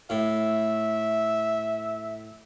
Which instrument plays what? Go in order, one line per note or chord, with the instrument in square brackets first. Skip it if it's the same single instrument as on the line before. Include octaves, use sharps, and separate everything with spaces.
[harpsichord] A2 [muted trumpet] E5